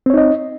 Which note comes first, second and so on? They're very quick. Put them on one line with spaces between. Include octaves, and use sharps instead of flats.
C4 C#5 D#4 D#5